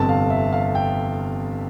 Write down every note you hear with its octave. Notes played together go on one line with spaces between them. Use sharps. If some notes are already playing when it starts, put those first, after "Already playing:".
Already playing: G1 F2 C3 A5
F5
E5
F5
G5